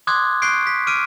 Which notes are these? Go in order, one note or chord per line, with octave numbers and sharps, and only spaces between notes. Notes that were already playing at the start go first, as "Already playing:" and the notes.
C6 D6 D#6 F#6 G#6
C#6 F#6 G6 C7 D7
B6
D6 F6 D7 D#7